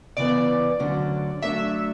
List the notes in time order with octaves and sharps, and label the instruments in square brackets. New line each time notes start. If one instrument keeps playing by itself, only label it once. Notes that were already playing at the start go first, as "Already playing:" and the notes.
[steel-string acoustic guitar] C#3 E3 B3 [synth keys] D5
[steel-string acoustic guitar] D2 D3 F#3 C#4
[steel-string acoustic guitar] F#3 A3 D4 [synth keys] E5